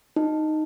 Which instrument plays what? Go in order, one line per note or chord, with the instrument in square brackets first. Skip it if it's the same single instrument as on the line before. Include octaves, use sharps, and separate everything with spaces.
[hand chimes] D#4